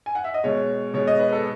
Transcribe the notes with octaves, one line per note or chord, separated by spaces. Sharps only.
G#5
F#5
E5
D#5
B2 G#3 C#5
B2 G#3 C#5
D#5
B4
A4